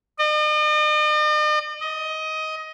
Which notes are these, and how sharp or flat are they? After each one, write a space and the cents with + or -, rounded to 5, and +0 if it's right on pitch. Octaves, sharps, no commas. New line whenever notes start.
D#5 -45
D#5 +15